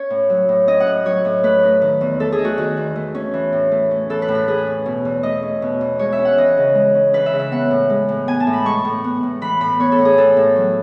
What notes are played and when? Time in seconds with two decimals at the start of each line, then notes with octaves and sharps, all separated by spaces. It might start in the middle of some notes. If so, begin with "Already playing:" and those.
Already playing: C#4 C#5
0.10 A2
0.30 F#3
0.49 A2
0.67 C#4 D#5
0.80 F#5
0.87 A2
1.06 F#3 C#5
1.25 A2
1.43 A3 B4
1.63 D#4
1.82 D#3
2.01 E2
2.20 A3 A4
2.32 G#4
2.38 D#4
2.45 F#4
2.58 D#3
2.77 E2
2.96 A3
3.15 C#4
3.34 E3
3.53 A2
3.71 A3
3.91 C#4
4.10 E3 A4
4.22 B4
4.28 A2
4.35 B4
4.47 A3 G#4
4.67 C#4
4.86 B2
5.05 E2
5.23 A3 D#5
5.43 C#4
5.62 B2
5.81 E2
5.99 G#3 C#5
6.13 E5
6.19 C#4
6.25 F#5
6.38 E3 D#5
6.57 C#3
6.75 G#3
6.95 C#4
7.13 E3 B4
7.26 E5
7.33 C#3
7.39 E5
7.52 B3 F#5
7.71 A2
7.90 G#3
8.09 A2
8.28 B3 G#5
8.40 A5
8.47 A2
8.53 B5
8.65 G#3 C#6
8.85 A2
9.04 B3
9.23 A2
9.42 E3 B5
9.61 A2 B5
9.79 B3 C#5
9.92 A4
9.98 A2
10.05 G#4
10.18 E3 A4
10.37 A2
10.56 F#3